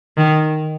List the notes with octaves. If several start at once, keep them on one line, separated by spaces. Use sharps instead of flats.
D#3